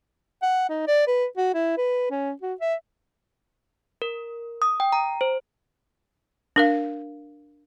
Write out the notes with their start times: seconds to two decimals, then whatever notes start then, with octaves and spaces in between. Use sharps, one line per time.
0.43 F#5
0.69 D#4
0.88 D5
1.07 B4
1.37 F#4
1.54 E4
1.78 B4
2.11 C#4
2.42 F#4
2.61 E5
4.02 A#4
4.62 D#6
4.80 G5
4.92 A#5
5.21 C5
6.56 D4 A#4 F5